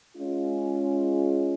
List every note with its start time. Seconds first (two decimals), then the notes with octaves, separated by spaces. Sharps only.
0.16 G#3 C#4 F4